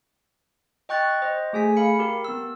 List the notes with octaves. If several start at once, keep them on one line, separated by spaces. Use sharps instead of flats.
D#5 G5 C#6 F#6 A6
C5 D#5
A3 G#4 G#5 B6
F5 B5 C#7
G4 A#4
B3 E6